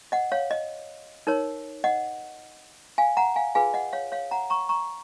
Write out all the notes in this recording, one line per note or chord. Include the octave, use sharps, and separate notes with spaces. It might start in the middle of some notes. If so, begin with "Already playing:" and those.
D#5 F#5
C#5 F5
D#5
D#4 A#4 C#5
D#5 F#5
F5 G#5
F#5 A#5
F5 G#5
F4 G#4 B4 F5 G#5
D#5 F#5
C#5 F5
C#5 F5
F#5 A#5
A#5 C#6
A#5 C#6